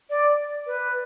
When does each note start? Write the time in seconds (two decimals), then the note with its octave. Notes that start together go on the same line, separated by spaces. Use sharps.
0.10 D5
0.66 B4